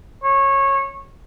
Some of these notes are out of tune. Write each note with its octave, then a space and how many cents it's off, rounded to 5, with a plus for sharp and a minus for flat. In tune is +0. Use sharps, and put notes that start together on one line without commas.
C#5 -20